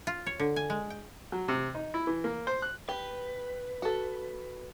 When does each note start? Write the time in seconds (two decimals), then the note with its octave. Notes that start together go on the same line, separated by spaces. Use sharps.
0.07 F4
0.26 C#5
0.40 D3
0.56 G#5
0.70 G#3
0.90 G5
1.32 F#3
1.48 C3
1.75 D#4
1.94 E4
2.07 E3
2.24 A#3
2.47 C5
2.62 F#6
2.89 G4 B4
3.82 F#4 A4